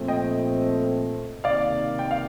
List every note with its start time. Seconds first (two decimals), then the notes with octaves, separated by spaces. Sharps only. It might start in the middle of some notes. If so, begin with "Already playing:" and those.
Already playing: A#2 F3 A3 C4
0.08 D#5 G5
1.44 C3 D#3 A#3 D#4 D5 F5
1.99 G5
2.11 F5